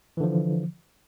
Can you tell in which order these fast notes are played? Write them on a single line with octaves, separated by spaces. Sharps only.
E3 D3 F3